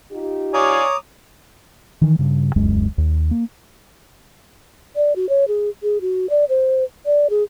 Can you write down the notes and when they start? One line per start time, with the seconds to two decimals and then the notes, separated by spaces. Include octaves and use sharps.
0.12 D#4 F4 G4
0.54 C#5 D5 F5 G#5 A#5 D6 D#6
2.02 D#3 E3
2.19 G2 C#3
2.56 D#1 C#2 F#2 G#3
2.98 D#2
3.31 A#3
4.96 D5
5.16 F#4
5.29 C#5
5.48 G#4
5.83 G#4
6.01 F#4
6.30 D5
6.49 C5
7.06 D5
7.30 G#4